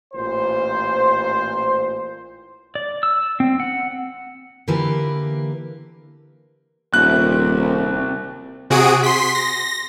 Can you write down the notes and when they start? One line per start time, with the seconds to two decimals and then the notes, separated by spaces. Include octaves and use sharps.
0.14 A1 A#2 C5
2.75 D5
3.03 E6
3.40 C4
3.60 F#5
4.68 D3 E3 A#3 G4 A#4 B4
6.94 D#1 C2 F#6
8.70 C3 F#4 G#4 D#6 D7
9.03 C6 B6
9.35 A#6